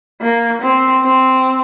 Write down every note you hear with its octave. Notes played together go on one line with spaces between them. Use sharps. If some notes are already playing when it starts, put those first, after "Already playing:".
A#3
C4
C4